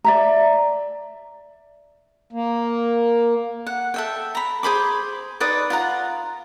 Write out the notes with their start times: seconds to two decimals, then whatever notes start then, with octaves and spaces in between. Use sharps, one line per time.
0.04 D5 E5 A#5
2.33 A#3
3.67 F#5
3.94 A4 E5 G5
4.35 A#5 B5
4.63 G#4 C5 B5 D6
5.40 D#4 B4 D5 D#6
5.70 F4 F#5 A#5